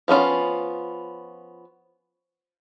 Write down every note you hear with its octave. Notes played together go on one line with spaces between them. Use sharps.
F3 B3 C#4 F4